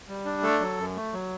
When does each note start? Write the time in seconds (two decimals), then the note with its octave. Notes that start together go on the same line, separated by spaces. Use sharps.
0.08 G3
0.25 D4
0.43 A3 A4
0.60 F#3
0.78 F#2
0.96 A3
1.13 F#3